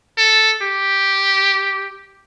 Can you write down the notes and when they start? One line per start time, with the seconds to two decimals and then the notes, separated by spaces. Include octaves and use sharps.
0.18 A4
0.62 G4